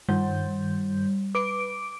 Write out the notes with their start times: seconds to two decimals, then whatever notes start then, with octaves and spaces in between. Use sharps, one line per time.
0.09 G2 D#3 G3 G6
1.35 B4 D6 D7